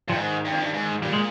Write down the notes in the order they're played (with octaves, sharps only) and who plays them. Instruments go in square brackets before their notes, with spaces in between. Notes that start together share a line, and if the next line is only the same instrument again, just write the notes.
[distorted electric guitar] G2 [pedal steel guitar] F3
[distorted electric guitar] G#2 [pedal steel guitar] D#3
[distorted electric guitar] G2
F2
G2
G#2
[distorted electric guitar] A#2 [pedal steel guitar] G3
[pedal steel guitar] G#3